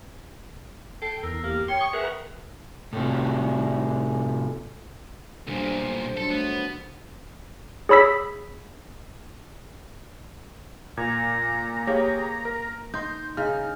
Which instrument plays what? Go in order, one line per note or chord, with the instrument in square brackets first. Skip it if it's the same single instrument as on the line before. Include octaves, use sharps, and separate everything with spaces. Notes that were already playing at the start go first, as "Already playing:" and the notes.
[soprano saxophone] A4 [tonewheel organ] G5 [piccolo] C7
[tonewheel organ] E2 [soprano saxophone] A#4 [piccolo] E6
[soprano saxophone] A#3 [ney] G4 [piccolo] F6
[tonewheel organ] C#5 [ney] G5 [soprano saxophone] C6 [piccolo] C#7
[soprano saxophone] C#6 [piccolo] D#6
[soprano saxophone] G#4 [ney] A#4 [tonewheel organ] B4 F#5 A#5 [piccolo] E5
[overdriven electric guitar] A2 C3
[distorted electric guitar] B1 A#2 [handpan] D3 G3 [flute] C5
[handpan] F#3 D4 [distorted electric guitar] A4
[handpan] A3 [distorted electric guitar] B3
[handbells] G#4 C#5 B5 E6 B6
[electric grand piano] A#2 G#6 [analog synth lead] A#5
[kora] A#3 B4 [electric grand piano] G4 G#4 C#5
[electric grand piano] A#4
[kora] D#4 [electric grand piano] C6 G6
[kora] C#3 [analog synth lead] D#4 [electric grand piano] F6